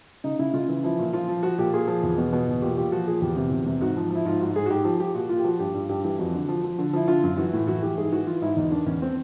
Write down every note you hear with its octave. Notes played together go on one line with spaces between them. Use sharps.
C#3 D#4
C#3 E4
C#3 F4
E3
F3 E4
A#2
F3 F4
F3
F3 F#4
A#2 G4
A#2 G#4
F3
E2
B2
B2
E2
A#2 G4
A#2 G4
F3 F#4
A#2 G#4
E2 G4
C3
E2
C3
G#2 F#4
F3
F3 E4
G#2 F4
G#2 F#4
G#2 G#4
F#4
G#2 G4
F3
F3 G4
A#2 F#4
A#2 F4
G4
F3 F#4
G2 G4
G2
G2 G4
E3 G4
F2 F#4
D3
F3
F3
D3
F3 E4
D3 F4
F#2
E3 F#4
A2
E3 F#4
E3 G4
G#2 G#4
E3 F#4
E3 F4
G#2 E4
E2 D#4
D#3 D4
E2 C#4
C4